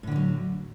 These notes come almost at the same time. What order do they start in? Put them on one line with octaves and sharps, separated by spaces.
A2 D3 E3 F#3